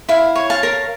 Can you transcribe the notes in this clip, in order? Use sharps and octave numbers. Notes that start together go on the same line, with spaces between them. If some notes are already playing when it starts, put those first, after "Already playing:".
E4 F5
C#5
F5 A5
A#4